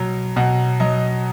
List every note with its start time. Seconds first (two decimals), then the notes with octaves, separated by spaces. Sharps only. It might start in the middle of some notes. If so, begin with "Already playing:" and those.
Already playing: B2 F#3
0.36 B2 F#5
0.80 F#3 D#5